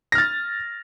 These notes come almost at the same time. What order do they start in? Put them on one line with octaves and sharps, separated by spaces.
A#6 F6 A6